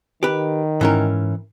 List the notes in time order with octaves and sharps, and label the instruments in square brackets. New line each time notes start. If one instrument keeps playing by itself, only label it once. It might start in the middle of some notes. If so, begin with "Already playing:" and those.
[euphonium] D#3 [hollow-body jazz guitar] G4 B4
[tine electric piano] G#2 [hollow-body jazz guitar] E3 C#4 A#4